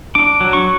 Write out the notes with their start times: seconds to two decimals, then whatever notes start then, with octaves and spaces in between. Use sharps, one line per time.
0.15 D4 D6
0.41 F#3
0.53 C#6